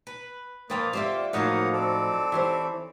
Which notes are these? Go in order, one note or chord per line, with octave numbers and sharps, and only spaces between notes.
B4
A#2 F3 A#3 B4 F5 G5 D#6
D3 C4 F4 G4 D5 E5
A2 F3 F#3 A#3 D#4 F5 F#5 D#6
C4 A4 D5
E3 G4 C5 C#5